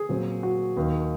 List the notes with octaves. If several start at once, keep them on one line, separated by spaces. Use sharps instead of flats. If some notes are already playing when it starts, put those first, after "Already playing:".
Already playing: G#4
A#2 F#3 C4
F#4
D#2 D#3 A#3